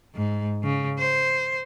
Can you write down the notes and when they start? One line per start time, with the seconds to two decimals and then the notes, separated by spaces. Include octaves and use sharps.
0.15 G#2
0.63 C#3
0.99 C5